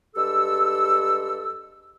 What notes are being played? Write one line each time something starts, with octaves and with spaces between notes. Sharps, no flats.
G2 G#3 G4 A4 E6